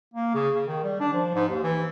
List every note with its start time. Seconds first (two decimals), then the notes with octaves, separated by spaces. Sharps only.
0.14 A#3
0.34 C#3
0.54 C#3
0.67 D#3
0.84 G3
1.00 D4
1.13 F3
1.34 G#2
1.48 D#2
1.63 E3